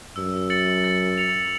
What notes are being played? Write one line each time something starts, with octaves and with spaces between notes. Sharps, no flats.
F#2 E6
A6 C#7 F#7
A6
C#7 F7